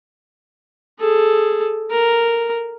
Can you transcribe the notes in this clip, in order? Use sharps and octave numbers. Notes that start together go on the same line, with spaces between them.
G#4 A4
A#4